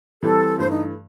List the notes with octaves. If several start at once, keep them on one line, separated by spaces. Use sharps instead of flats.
E3 G3 C4 A4
G2 E3 A3 C5
D#4